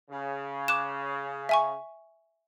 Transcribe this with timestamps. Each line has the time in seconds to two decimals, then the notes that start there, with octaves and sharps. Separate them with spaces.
0.10 C#3
0.68 D6 F#6 E7
1.49 E5 G#5 C#6